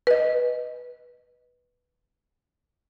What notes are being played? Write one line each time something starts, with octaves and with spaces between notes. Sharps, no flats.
B4 D#5